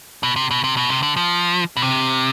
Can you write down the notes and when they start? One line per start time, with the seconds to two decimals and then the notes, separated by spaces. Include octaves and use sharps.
0.23 B2
0.36 C3
0.51 B2
0.64 C3
0.77 B2
0.89 C3
1.03 D3
1.17 F3
1.77 B2
1.82 C3